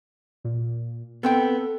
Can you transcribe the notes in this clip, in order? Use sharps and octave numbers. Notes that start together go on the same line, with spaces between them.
A#2
B3 C4 A4 G5